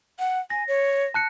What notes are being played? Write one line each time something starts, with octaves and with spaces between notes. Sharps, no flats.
F#5
G#5 A#6
C#5
A5 F#6 C#7